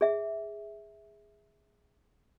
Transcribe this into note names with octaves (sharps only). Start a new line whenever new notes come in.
G#4 E5